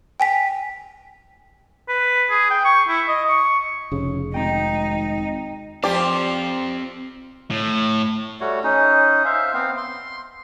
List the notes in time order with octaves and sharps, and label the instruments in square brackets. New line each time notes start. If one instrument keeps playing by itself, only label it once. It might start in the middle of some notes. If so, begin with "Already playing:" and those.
[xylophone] G5 G#5 B6
[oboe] B4
G#4
G5
C#6
E4
D#5
C#6
[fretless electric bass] F1 [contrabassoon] C#3
[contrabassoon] G#1 [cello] D#4 [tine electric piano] G5 A#5
[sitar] F3 G4 [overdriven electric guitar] C4 F5 [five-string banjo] D5
[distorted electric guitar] A2
[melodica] G3 A3 F#4 C#5
C#4 D#4
C5 E5 F5
B3 C4 F5
C6